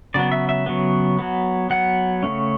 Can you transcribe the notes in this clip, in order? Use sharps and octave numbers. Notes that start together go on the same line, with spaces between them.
C#3 F#3 B3 D5
E5
E5
C#3 F#3 B3
F#3 B3
F#3 B3 F#5
C#3 F#3 A3 C#4